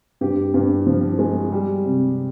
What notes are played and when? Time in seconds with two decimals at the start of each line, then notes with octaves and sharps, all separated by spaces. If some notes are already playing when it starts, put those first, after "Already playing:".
0.21 G2 G4
0.54 G2
0.87 F3
1.19 G#3
1.52 G3
1.85 C3